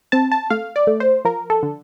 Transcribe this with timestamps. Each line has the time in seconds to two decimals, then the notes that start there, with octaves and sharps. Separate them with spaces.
0.12 C4 A5
0.32 A5
0.50 A3 F5
0.76 D5
0.87 A3
1.00 C5
1.25 F3 A#4
1.50 A4
1.63 D3